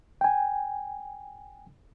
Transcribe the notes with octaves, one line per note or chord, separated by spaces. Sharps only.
G5 G#5